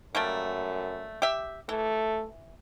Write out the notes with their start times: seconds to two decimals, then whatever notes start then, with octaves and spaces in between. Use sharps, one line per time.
0.15 F#2 G3 A3 A#3
1.22 G4 E5
1.69 E3 A3